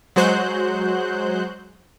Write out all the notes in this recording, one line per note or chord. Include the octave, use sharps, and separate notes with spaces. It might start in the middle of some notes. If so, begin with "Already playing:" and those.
F#3 G#3 F#4 C5 F#6 G6